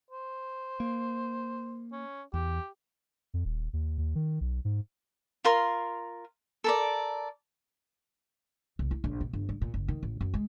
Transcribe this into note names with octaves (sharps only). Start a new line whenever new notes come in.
C5
A#3
C#4
E2 G4
F2
D#1
D#2
D#2
D#3
B1
G#2
F4 A#4 C6
A4 A#4 D5
C2
E4
A#1
B2
G1
G2
A#2
F#1
D#3
A1
F#2
G#3